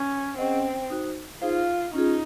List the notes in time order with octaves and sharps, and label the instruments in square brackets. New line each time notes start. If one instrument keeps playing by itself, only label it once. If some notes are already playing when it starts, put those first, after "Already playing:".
Already playing: [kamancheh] C#4
[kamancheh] C4 [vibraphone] C#4 G#4 C5 D#5 F#5
[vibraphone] D#4 F#4 C5
[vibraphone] D#4 G#4 C5 F5 [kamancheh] F4
[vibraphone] C#4 F4 G#4 [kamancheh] D#4